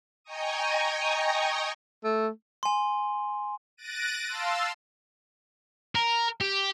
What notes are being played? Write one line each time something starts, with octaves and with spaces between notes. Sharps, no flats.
D#5 G5 G#5 A#5 C#6 D#6
A3
G#5 C6
F#6 A6 A#6 D7 D#7
F5 A5 C6 E6
A#4
G4